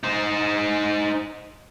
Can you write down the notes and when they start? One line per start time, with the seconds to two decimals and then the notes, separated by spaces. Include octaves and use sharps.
0.03 D#4 C5